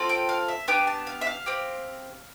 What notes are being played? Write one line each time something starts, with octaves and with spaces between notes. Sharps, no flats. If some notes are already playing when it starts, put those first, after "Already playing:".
Already playing: C4 F4 A4
G5
F5
E5
B3 D4 G4 G5
A5
F5
E5
F5
C4 G4